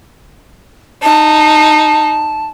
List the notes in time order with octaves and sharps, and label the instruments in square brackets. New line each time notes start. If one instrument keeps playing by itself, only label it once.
[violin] D#4 [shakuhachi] A5